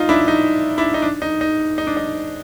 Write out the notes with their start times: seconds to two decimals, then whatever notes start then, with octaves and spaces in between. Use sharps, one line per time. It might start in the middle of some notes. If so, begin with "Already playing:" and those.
Already playing: D#4 F4
0.09 D4 E4
0.28 D#4
0.78 D4 E4
0.94 D#4
1.02 D4
1.22 D#4
1.41 D#4
1.78 D#4
1.87 D4
1.97 D#4